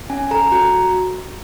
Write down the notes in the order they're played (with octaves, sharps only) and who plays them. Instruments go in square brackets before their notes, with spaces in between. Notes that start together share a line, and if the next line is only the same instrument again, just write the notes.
[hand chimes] C#4 G#5
A4 A#5
F#4 A#5